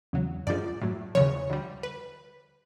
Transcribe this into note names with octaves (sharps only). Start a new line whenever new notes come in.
E2 C#3 F#3
F#2 D3 F3 G#3 D5
A2 F#3
E2 C#3 F3 C#5
D2 D3 G3
B4